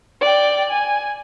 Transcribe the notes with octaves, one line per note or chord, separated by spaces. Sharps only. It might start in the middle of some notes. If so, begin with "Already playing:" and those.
D5 G5
G#5